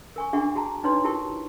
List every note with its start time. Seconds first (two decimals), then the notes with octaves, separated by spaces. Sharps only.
0.16 A#4 G#5 C#6
0.33 D4 F#4 G#4 E5 F#5 C#6
0.55 F#4 G#4 A5 A#5
0.83 D4 D#4 B4 C#5 C6
1.04 E4 F#4 G4 A#4 A5 C#6